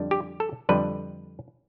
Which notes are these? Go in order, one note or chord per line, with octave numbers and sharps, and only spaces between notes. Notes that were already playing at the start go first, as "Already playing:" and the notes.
Already playing: F2 D3 G3 D4
G4
A4
F2 D3 G3 D4 B4